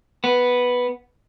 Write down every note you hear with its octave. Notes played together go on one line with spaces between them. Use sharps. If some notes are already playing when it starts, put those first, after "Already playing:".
B3